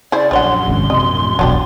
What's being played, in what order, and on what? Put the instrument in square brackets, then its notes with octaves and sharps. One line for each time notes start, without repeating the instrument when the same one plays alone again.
[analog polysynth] C#3 [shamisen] E4 G#4 C5 [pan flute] D5
[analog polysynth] A#1 F#2 [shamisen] D4 C#5 F#5 [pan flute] C6
[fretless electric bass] G#1 G#2 C#3
[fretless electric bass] C3 [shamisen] D#5
[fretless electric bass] A2
[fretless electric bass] E1 B1 [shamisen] F#3 D4 G4